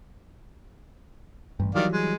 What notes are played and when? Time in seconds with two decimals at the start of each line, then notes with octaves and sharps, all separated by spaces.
1.60 A1 G2
1.75 D#3 E3 F#3 G3 D5 F5
1.92 G#3